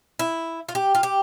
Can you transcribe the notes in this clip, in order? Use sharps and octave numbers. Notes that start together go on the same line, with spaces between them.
E4
F4
G4
F4
G4